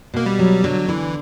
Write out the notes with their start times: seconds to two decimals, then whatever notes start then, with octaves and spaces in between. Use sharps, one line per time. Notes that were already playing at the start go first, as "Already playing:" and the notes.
0.14 B2 A#3
0.26 G3
0.39 F#3
0.64 D3 F#3
0.88 D3 E3